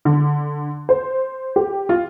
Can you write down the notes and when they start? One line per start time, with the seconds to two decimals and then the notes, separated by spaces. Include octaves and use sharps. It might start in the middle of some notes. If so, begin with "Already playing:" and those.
0.05 D3
0.89 C5
1.56 G4
1.89 F4